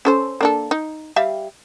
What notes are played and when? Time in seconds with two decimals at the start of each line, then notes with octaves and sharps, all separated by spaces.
0.05 C#4 A4 C5
0.41 A#3 D4 A4
0.71 D#4
1.16 G3 E5 F5